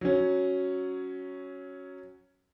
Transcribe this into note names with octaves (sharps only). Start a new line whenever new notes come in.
F#3 C#4